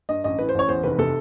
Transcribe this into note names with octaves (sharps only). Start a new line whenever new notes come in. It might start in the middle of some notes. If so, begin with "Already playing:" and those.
G2 D#5
A1 D#5
E3 B4
C5
A1 C#5
E2 C5
F1 B4
C3 A4